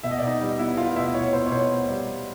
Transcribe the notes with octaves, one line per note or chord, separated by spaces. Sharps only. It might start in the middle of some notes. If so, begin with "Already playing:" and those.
B2 E5
D#5
D5
B2
D#4 D#5
G3
B3 E4 E5
B3 F4 F5
B2 E4 E5
B2 C#5
B3 C5
C#5
B2 C5
B3
G3